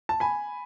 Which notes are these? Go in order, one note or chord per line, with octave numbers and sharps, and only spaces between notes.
A5
G#5 B5